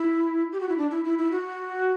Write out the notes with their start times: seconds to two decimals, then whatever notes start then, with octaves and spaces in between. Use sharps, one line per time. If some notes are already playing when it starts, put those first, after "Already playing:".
Already playing: E4
0.52 G4
0.60 F#4
0.69 E4
0.77 D4
0.91 E4
1.05 E4
1.18 E4
1.31 F#4